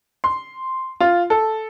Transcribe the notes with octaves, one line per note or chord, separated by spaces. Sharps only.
C6
F4
A4